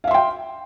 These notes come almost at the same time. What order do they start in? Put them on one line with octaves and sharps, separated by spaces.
F5 E5 C6 G5